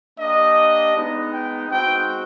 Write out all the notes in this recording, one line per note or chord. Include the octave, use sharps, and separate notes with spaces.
A#3 D4 G4 D#5
G#3 B3 D#4
G5
G#3 C4 D#4 F#4 G5